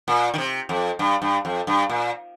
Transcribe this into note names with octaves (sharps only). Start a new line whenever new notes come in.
A#2
D#3
C3
F2
G2
G2
F2
G2
A#2